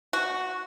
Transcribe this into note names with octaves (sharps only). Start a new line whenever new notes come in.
F#4